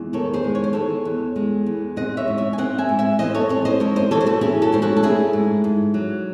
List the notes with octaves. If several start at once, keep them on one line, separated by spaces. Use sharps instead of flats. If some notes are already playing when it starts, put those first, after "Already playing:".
Already playing: E2 G#3
D#3 A4 C#5
G#4 C5
G#3
C#5
C5
E2 A4 C#5
E2
G#3
E2
C4 D#5 F#5
C#5 E5
G#2
C#5 E5
G#5
C4 D#5 F#5
E5 G#5
G#2
E5 G#5
E3 C5 D#5
A4 C#5
C4 A4 C#5
C5 D#5
G#2 A4 C#5
C5 D#5
E3 A4 C#5
C5
F#4 A4
C#4 E4 G#4
F#4 A4
G#2 C5
F#4 A4
A4
A3 E4 G#4
G#2
G#2
F#3